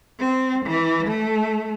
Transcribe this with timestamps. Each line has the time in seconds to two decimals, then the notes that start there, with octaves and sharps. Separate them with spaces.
0.19 C4
0.66 E3
1.08 A3